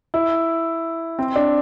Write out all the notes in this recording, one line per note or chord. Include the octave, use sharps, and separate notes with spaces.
E4
C4
D4